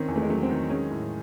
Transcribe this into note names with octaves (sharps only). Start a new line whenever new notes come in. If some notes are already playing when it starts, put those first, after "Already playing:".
Already playing: D#3 C4 C#4
E2
A3
G#3
F#3 A3
C4
D#3
G#3 C#4
A2